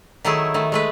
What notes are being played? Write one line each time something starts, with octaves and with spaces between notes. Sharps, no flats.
D#3 F#3 A3 E4 G#4
D#3 A3
G#3 A3 B4